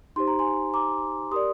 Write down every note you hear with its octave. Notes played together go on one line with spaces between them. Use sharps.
D#4 G4 C5 C6
A#5
G#5 C6
A#5 D6
G4 A#4 D5 C6 D#6